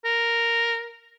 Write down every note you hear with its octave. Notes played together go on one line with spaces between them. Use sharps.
A#4